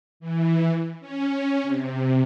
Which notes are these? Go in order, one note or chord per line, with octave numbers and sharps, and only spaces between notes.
E3
C#4
C3